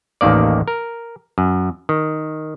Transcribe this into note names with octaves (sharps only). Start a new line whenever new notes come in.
A1 D#2 D#3 A#3 D5
A#4
F#2
D#3